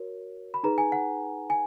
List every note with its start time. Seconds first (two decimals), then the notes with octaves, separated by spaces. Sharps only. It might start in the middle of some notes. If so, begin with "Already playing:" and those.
Already playing: F#4 A#4 C#5
0.54 B5
0.63 D#4 G#4 B4 A#5
0.78 G#5
0.92 F#5
1.50 G#5